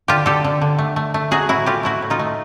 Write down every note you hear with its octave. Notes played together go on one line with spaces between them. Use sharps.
D3 F4 G4
D3 G4 A4
D3
D3
A3
A3
A3
F#3 F#4 G#4
A2 E4 F#4
A2 F4 G4
A3 E4 F#4
A2
D#4 F4
A3